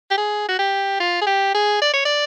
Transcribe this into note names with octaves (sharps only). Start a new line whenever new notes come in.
G4
G#4
F#4
G4
F4
G#4
G4
G#4
D5
C#5
D5